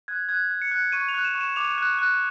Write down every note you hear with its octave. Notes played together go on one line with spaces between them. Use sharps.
F#6 G#6
F#6 G#6
F#6
C#7
F#6
C#6 D#7
F7
F#6
E7
C#6
E7
D6 F7
F#6
F#6